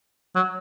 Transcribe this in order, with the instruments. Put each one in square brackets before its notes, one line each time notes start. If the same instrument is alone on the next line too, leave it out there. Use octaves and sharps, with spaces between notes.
[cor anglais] F#3